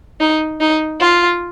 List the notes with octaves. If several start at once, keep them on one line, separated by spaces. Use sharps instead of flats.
D#4
D#4
F4